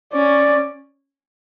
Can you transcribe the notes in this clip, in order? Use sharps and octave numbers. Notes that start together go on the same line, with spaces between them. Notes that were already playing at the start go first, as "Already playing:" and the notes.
C#4 D5